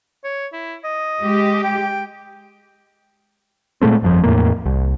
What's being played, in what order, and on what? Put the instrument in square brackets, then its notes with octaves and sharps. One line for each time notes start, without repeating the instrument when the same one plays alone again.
[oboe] C#5
E4
D#5
[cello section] G#3 G4
[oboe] G5
[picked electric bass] A#2 G#3 A3 C4
G1 F2 F3
E2 A2 A#3
C2